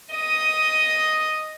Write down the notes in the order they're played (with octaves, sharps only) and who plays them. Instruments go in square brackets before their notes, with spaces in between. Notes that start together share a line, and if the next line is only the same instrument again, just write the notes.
[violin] D#5 D#7